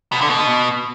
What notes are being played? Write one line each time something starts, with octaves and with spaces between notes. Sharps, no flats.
B2
D3
B2